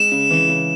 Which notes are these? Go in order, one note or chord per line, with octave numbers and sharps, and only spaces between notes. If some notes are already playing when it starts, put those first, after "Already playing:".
Already playing: G#3 E7
C#3
E3
C#3